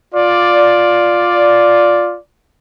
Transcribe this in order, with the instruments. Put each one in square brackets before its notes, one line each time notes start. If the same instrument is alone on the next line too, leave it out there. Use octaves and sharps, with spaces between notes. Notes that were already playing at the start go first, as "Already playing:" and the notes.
[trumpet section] F4 D5